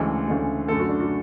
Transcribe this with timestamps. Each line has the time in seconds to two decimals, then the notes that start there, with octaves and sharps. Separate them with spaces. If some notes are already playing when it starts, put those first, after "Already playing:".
Already playing: D2 C#3 E3 G#3 A4
0.28 D2 C#3 E3 G#3
0.68 F#2 D3 A3 A4
0.79 F#4
0.89 D4
1.00 F#4